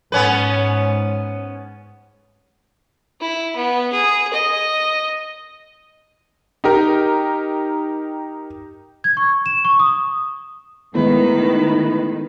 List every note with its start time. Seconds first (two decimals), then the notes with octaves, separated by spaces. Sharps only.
0.12 G#2 B3 C#4 B4
3.21 E4
3.56 B3
3.93 G#4
4.33 D#5
6.64 D#4 G4 A#4
9.04 G#6
9.17 C#6
9.46 E7
9.65 C#6
9.80 D#6
10.95 A2 D#3 G#3 B3 B4